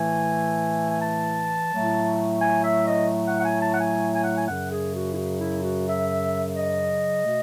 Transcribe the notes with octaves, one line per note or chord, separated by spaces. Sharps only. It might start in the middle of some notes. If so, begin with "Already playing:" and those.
Already playing: A2 E3 A3 G#5
G#5
A5
A2 F#3 A3
G#5
E5
D#5
F#5
F#5
G#5
A5
F#5
G#5
G#5
F#5
G#5
F#2 C#3 F#3 F#5
G#4
F#4
E4
F#4
E4
F#4
E5
D#5
B2 A3